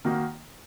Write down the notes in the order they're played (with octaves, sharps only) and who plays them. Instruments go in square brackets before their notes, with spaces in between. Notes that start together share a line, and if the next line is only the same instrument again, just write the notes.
[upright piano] D#3 A#3 D#4 F#4